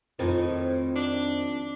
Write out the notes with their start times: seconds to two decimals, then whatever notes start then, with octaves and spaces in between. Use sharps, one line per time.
0.19 F2 A2 D#3 C4 D#4
0.96 D4